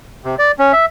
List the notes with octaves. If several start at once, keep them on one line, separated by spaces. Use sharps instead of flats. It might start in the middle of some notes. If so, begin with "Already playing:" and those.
C3
D5
C#4
E5